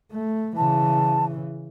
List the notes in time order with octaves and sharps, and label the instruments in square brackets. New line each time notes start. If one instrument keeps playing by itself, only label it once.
[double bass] A3
[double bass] C#3 E3 [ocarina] A5